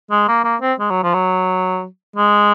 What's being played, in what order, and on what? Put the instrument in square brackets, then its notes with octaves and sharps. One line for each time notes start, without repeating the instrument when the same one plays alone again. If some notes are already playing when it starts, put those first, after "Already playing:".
[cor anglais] G#3
A#3
A#3
C4
G#3
F#3
F3
F#3
G#3